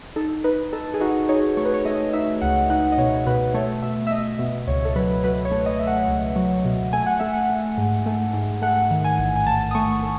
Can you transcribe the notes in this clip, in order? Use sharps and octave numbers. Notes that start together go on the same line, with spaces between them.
D#4 A4
D#4 B4
D#4 A4
G#4
D#4 F#4
D#4 C#5
A3 C#5
B4
C#5
A3 D#5
D#4 E5
C#2 F#5
D#4 F#5
D#5
B2 C#5
B2 B4
A3 C#5
B2 E5
E5
A3 D#5
B2
C#2 C#5
A4
F#3 B4
F#3 B4
C#5
A3
D#5
A3 E5
F#5
C#2
F#3
B2
A3 G#5
F#5
A3 E5
F#5
A3
G#2
A3
G#2
A3 F#5
D#3
G#5
A1
G#5
A1 A5
D#6
A3 C#6
A3